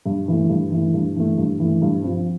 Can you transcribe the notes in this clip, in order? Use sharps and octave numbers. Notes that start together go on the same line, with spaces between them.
G2
E3 A3
G2
E3 A3
G2
E3 A3
G2
E3 A3
G2
F3 C4